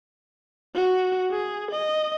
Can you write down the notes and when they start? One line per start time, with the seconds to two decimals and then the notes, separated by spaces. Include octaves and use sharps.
0.75 F#4
1.31 G#4
1.71 D#5